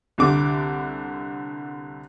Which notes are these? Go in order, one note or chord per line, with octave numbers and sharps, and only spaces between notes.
C2 D3 D6